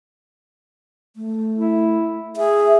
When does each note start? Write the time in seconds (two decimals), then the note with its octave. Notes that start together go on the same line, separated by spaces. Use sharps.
1.16 A3
1.55 E4
2.37 G#4 E5